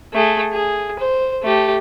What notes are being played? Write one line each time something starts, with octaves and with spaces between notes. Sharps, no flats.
A3 G#4
G#4
C5
A3 G4